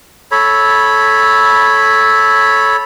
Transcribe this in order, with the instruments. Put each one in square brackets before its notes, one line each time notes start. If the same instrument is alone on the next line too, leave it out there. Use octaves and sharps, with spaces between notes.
[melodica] A4 C#5 B5